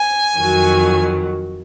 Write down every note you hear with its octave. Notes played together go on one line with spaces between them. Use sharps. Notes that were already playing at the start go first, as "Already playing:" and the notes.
Already playing: G#5
F2 D#3 F#3